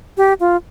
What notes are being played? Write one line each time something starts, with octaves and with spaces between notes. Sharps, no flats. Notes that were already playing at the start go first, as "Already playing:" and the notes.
G4
F4